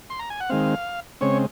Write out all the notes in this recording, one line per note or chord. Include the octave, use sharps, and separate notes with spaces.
C6
A#5
G#5
F#5
D#3 G#3 C4 F5
C#3 G#3 C4 C#5